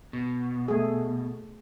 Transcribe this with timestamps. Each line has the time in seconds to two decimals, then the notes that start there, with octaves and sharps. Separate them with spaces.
0.13 B2
0.68 A3 G#4